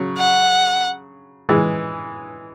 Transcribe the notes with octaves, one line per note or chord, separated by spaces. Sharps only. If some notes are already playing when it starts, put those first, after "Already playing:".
Already playing: C#3 F#3
F#5
E3 G#3